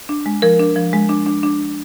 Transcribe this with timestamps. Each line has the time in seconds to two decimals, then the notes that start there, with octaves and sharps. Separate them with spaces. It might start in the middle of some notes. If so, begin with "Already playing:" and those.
0.09 D4
0.26 G#3
0.42 F3 A#4
0.59 D4
0.76 F3
0.93 G#3
1.09 D4
1.26 D4
1.43 D4